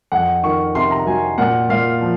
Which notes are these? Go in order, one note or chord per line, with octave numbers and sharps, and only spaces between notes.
F2 F#5
D#3 C#6
C3 C6
A#5
F#3 G#5
A#2 F#5
A#2 F5
F3